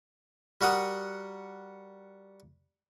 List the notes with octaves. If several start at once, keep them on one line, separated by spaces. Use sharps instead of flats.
G3 F#4 A#4 F#5 D#6